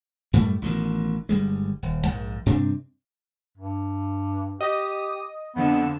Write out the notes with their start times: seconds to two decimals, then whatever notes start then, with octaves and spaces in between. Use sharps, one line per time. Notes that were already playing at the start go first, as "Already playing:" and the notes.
0.33 F#2 A2 G3 A3
0.62 A1 B2 D3 D#3
1.29 G1 G3 G#3
1.83 D#1
2.04 A#1 G#2
2.46 G2 C3 C4 D4
3.58 G2
4.61 G4 D#5 D#6
5.55 F2 D3 B3 E7